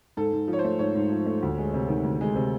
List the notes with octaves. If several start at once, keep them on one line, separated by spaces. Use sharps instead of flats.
G#2 A4
G#2
F3
C#5
C5
A3
G#2 C#5
G#2
F3
A3
D2
G#3
C3
D#3
D2
G#3
C3